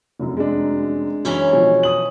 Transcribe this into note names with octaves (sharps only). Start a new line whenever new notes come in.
F1 F#2
G#3 D4
F#2 E3 C#4 E4
B2 F3 F#3
D#6 F#7